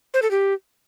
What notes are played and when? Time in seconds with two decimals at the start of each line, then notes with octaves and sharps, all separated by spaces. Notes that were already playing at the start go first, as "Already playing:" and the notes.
0.14 C5
0.22 A4
0.31 G4